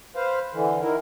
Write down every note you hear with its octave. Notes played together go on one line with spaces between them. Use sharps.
B4 C5 F5
D3 E3
D#3 E4 A#4